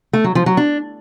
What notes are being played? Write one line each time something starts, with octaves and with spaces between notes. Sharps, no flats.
A3
F#3
F3
F#3
D4